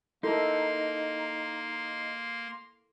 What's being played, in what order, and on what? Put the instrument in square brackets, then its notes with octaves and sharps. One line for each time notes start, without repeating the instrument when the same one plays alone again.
[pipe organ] A#3 [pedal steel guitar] D#4 [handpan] E4 A4 A#4 [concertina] C6